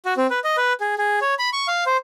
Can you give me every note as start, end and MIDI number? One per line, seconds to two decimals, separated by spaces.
0.05 0.14 66
0.17 0.27 60
0.30 0.39 71
0.44 0.57 75
0.57 0.73 71
0.80 0.95 68
0.98 1.19 68
1.21 1.34 73
1.39 1.50 83
1.53 1.67 85
1.68 1.84 77
1.86 1.97 72